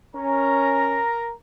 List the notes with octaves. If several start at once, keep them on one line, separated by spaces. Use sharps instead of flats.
C#4 A#4 A#5